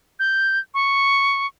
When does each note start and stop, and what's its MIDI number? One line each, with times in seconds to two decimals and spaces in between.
0.20 0.59 91
0.74 1.47 85